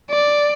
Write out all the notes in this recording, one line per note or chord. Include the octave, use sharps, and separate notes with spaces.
D5